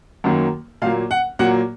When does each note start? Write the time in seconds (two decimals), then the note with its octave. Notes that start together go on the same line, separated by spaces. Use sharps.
0.24 F#2 D#3 F#3 A#3
0.82 A#2 F#3 A#3 F5
1.11 F#5
1.39 A#2 F#3 A#3 F#5